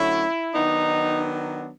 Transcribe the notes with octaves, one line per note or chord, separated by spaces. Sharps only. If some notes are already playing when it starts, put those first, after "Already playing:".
Already playing: D3 F#3 A3 C#4 E4
D#3 F#3 B3 D4 D#4